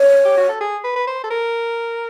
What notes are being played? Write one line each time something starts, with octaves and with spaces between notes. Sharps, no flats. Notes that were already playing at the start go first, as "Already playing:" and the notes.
Already playing: C#5
G4
F#4
A4
G#4
B4
B4
C5
A4
A#4